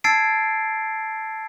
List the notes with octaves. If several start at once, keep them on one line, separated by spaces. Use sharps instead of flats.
A5 E6 G#6 A6 C7 D7